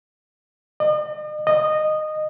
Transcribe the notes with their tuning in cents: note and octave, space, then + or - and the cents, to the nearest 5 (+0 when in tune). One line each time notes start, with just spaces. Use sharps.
D#5 -45
D#5 -15